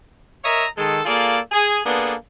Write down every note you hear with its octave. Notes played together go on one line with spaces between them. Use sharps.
A#4 C#5 D#5 E5 A#5
D#3 G#3 A4
A#3 F4 G#4 A4 D5
G#4
A#3 B3 D4 G#4 A4